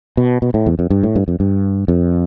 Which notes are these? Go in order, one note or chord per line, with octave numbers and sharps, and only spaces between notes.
B2
B2
A2
E2
F2
G2
A2
G2
F2
G2
F2